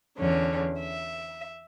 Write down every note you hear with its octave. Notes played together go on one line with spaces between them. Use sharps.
E2 D3 C#4
E5